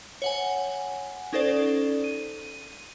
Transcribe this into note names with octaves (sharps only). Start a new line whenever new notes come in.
C#5 F#5 G#5
C#4 D#4 A4 C5 D5
D#7